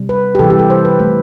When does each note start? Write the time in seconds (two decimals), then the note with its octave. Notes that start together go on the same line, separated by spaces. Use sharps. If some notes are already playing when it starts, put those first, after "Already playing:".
Already playing: C3 G3
0.09 B4
0.35 G4
0.39 C3 E3 G3 A4
0.50 G4
0.59 A4
0.70 C5
0.85 B4
0.99 C3 E3 A3 A4